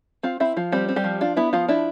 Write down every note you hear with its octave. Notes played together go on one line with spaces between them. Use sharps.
C4 F4 F5
C4 E4 E5
F3 F4
G3 C4 G4
C4
G3 G4
F3
D4 F4
B3 E4
F3 F4
D4 E4